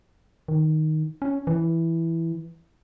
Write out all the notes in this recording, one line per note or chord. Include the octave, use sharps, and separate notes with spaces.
D#3
C#4
E3